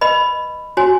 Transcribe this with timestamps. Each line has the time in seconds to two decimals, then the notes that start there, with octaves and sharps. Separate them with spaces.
0.01 B4 D#5 B5
0.77 F#4 C#5 G#5